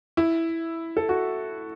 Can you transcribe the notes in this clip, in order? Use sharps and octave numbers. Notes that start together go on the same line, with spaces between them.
E4
A4
F#4